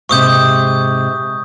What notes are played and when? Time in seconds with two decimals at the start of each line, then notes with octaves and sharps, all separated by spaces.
0.09 G#2 C3 C#6 D#6 G6